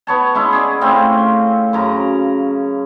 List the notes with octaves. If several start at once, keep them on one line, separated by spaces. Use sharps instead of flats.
B3 C#5 A5
G#3 C#4 E4
G#4 D5
A2 C4 C#4 F4
F#2 C#3 A#5